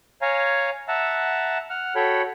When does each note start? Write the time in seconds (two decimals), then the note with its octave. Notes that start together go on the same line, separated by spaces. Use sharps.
0.22 C#5 F5 G#5 A#5
0.88 E5 F#5 A5 A#5 E6
1.70 F#5 F6
1.95 F#4 A4 C#5 G5 B5